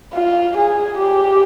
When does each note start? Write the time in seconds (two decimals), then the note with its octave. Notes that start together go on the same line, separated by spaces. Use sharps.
0.14 F4
0.57 G#4
0.97 G4